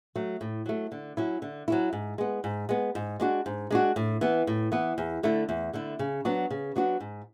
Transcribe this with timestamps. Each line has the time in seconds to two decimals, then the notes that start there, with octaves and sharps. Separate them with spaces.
0.16 F#3 A3
0.41 A2
0.66 F#3 A3
0.92 D3
1.17 F#3 C#4 E4
1.42 D3
1.68 F#3 C#4 E4
1.93 G#2
2.18 G#3 B3
2.44 G#2
2.69 G#3 B3
2.95 G#2
3.20 G#3 D4 F#4
3.46 G#2
3.71 G#3 D4 F#4
3.96 A2
4.21 E3 B3
4.47 A2
4.72 E3 B3
4.98 E2
5.23 D3 A3 E4
5.49 E2
5.73 D3 A3 E4
5.99 C#3
6.25 F#3 B3 D4 F#4
6.51 C#3
6.76 F#3 B3 D4 F#4
7.00 G#2